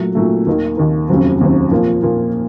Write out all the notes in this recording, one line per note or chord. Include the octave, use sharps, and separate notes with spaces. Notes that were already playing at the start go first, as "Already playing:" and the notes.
Already playing: A#2 F#3 A3
A#2 F#3 A3
D#2 D#3 A#3
D#2 D#3 A#3
F1 D#2 C#3 F#3 C4
F1 D#2 C#3 F#3 C4
A#2 F3 A#3 F4
A#2 F3 A#3 F4